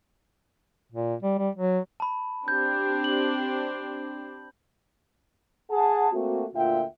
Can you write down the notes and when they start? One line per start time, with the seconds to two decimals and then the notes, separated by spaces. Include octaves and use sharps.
0.92 A#2
1.23 G3
1.38 G3
1.55 F#3
2.00 A5 B5
2.48 C4 D4 G4 G6
3.04 F#7
5.70 G#4 F#5 A5
6.12 A3 A#3 C4 F#4
6.55 D2 A#2 F4 E5 F#5 G5